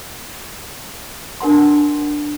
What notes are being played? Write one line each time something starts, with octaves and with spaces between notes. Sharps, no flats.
D4 A#4 F#5 C6